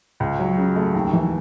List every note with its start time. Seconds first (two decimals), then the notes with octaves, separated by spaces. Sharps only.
0.20 C#2
0.39 F#3
0.58 C#3
0.76 A3
0.94 D#2
1.13 E3